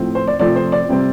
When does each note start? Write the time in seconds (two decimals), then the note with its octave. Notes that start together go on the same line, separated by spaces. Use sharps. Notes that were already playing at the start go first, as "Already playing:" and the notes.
Already playing: A2 F3 C4
0.15 C5
0.27 D5
0.40 C3 F3 A3 C4 D5
0.56 C5
0.72 D5
0.89 C3 G3 C4